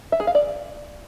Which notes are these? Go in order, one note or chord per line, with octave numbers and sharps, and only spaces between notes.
E5
G#4
F5
D5